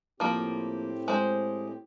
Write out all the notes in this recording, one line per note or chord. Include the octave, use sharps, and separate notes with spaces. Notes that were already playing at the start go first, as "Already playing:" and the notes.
A2 F3 A#3 C4 G4
G#3 C5